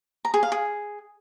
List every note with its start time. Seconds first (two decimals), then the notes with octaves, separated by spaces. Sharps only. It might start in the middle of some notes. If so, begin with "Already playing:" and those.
0.25 A#5
0.34 G#4
0.43 F5
0.52 G#4